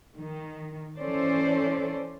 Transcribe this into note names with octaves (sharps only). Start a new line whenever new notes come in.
D#3
E3 C#4 A4 C5 D5